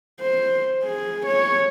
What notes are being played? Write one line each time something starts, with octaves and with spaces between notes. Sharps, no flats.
C5
G#4
C#5